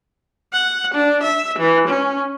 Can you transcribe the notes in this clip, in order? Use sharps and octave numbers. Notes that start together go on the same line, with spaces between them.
F#5
D4
E5
E3
C#4